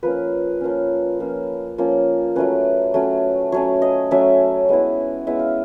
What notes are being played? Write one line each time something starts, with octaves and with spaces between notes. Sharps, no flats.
F3 A#3 C#4 B4
F3 A#3 C#4
F3 A#3 C#4
F3 A#3 C#4
F#3 A3 C#4 B4
F#3 A3 C#4
F#3 A3 C#4 C#5
D#5
F#3 A3 C#4 E5
G#3 B3 E4
G#3 B3 E4 E5
F5